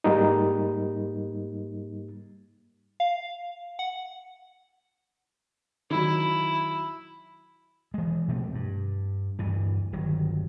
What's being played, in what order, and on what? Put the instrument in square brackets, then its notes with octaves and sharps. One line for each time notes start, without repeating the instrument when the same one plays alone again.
[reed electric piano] G#2 G3 A#3 D#4
[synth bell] F5
F#5
[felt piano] D#3 F#3 [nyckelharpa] E4
[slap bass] E3 G#3
B2 F3 A3 C4
G2
D2 G2 E3
G1 D#3 F#3